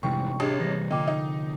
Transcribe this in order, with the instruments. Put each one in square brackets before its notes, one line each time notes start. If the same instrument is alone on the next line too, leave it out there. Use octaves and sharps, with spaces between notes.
[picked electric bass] F1 G#2 E3 [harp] C3 G3 [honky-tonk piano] C#6
[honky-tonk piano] A1 [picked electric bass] D4 [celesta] G4 G#4 D#5
[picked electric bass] E3 G3 [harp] A#6
[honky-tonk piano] A#2 [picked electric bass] D3 F3 [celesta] D#5 G5 D6
[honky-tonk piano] D#4